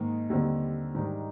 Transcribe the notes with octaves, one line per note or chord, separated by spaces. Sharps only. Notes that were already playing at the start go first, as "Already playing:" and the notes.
Already playing: G#2 D#3 A#3
D#2 D3 G3 C4
G#2 D#3 G3 D4 G4